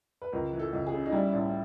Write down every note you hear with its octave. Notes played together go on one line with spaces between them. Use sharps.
B4
C#2 A#4
E3
A4
C#2
G#4
C#3
D#4
G3 E4
A1